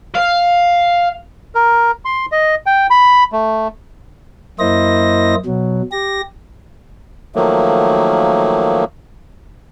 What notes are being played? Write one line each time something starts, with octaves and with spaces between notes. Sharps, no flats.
F5
A#4
C6
D#5
G5
B5
A3
F#2 A#3 E4 C5 D#5 A#6
B2 F#3
G4 A#6
D#3 F3 F#3 A3 A#3